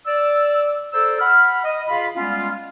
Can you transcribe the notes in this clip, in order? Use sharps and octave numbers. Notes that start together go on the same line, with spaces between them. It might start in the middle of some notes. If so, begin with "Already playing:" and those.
D5 E6
A4 C5 D5 A#5 E6
F#5 B5 F6
D#5
C#3 F4 F5 B5
G3 G#3 B3 C#4 F4